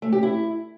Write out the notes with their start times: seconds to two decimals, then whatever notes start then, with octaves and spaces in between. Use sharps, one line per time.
0.02 A3
0.12 G4
0.23 E4